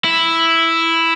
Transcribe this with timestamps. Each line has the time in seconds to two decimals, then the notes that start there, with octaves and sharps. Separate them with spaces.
0.04 E4